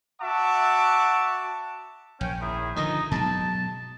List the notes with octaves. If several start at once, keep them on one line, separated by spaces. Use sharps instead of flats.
F#4 E5 F#5 A5 C#6 D6
A#1 C#4 G5
D#3 E4 G#4
D3 D#3 F3 D#4 D#5
B2 F#3 G#3 A5